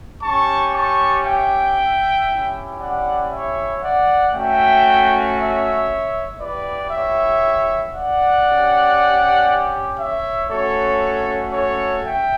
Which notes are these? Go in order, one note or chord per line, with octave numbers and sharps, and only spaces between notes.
C#4 G4 A5 C#6
A5 C#6
E5 G5
C#4 E4 G4
D5 F#5
C#5 E5
D5 F#5
A3 C#4 F#4 E5 G5
C#5 E5
B3 E4 G4 B4 D5
C#5 E5
D5 F#5
C#4 G4
C#5 E5
A3 C#4 F#4 A4 C#5
A4 C#5
E5 G5